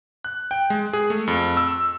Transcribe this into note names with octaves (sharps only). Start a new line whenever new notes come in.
F#6
G5
G#3
G#4
A3
F2
E6